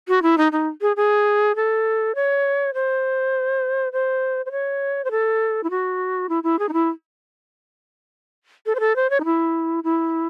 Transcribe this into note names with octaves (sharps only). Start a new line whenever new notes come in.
F#4
E4
D#4
D#4
G#4
G#4
A4
C#5
C5
C5
C5
C#5
C5
A4
E4
F#4
E4
E4
G#4
D#4
E4
A4
C5
A4
C5
C#5
D#4
E4
E4